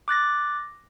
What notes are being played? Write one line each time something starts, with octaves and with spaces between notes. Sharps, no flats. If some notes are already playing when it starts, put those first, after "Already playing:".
D6 F#6 A6 A#6